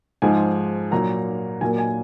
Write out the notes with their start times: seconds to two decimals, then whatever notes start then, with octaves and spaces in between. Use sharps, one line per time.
0.22 G#2 F3 G#3 G#5
0.91 A#2 F#3 A#3 A#5
1.61 A#2 F#3 A#3 G#5
1.78 G#5